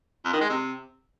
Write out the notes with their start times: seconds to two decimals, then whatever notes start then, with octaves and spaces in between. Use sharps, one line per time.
0.25 F2
0.33 D#3
0.41 G#3
0.49 C3